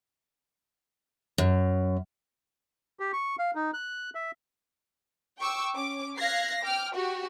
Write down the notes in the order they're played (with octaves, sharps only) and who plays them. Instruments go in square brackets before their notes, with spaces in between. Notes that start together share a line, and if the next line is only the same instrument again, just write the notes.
[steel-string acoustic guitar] F#2
[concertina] G4
C#6
F5
D#4
F#6
E5
[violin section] G5 C#6 D6 E6
C#4 D6
F5 F#6 G#6 A#6 C7
G5 D6 F6
F#4 G4 F#5